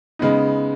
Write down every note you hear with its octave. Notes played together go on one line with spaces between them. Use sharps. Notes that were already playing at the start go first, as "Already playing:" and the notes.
C#3 G#3 B3 D#4